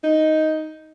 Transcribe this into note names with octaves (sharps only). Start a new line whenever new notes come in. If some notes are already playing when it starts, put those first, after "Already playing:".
D#4